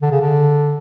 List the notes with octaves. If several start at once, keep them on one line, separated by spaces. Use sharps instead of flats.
D3
C#3
D3